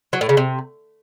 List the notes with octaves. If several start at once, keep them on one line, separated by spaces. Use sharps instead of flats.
F#3
A2
C#3
C3